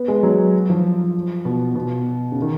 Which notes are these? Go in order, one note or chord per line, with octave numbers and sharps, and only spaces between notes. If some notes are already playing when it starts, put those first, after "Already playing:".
Already playing: B3
G#3
F#3
F3
B2
B2
C#3
D#3